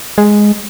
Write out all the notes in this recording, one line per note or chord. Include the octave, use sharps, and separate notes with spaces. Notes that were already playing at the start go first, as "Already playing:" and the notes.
G#3